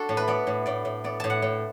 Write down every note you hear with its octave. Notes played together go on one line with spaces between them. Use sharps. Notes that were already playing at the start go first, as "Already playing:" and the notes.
Already playing: D4 F#4 A4
A2
B4
B3 D5
A2
A2 D5
A2
B3 D5
A2 A5
F#5
A2